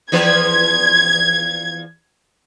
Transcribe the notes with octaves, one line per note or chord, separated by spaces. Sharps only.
E2 F3 B4 G#6